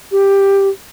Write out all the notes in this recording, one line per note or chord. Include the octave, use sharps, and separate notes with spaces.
G4